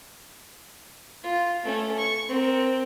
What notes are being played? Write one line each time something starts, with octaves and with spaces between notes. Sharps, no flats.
F4
A3 C#4
C#6
C4 A#4